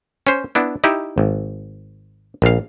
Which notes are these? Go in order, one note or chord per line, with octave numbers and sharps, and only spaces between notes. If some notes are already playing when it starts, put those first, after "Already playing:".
C#4 C5
B3 D4 E4
D#4 E4 G4 E5
G#1
A#1 F5